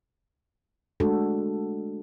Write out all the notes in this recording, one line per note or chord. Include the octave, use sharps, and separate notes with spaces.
G#3 A3 D4 F#4 A4